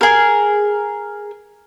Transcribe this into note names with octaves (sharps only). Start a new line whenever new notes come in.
G#4 A#4